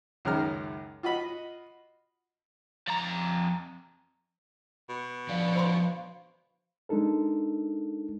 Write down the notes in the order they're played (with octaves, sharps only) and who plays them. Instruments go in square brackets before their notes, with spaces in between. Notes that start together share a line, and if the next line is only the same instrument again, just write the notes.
[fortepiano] C#2 F#2 D#3 G#3 A#5 F6
F4 F#4 D#5 B5
[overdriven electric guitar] F2 A#5
[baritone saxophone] B2
[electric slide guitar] D3 F3 D5 [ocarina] F5
[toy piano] C5 B5 C6
[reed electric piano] G#3 D4 D#4 A4 A#4